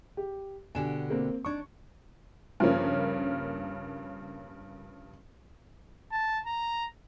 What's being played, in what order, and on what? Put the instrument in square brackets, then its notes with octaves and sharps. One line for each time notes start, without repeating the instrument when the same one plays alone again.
[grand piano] G4
[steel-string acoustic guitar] B2 D3 G4 [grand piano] G#5 E7
[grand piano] A#3 C4
[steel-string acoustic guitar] D4 D#4 [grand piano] C#6 G#6
[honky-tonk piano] G2 C#3 F3 A#3 C#4
[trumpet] A5
A#5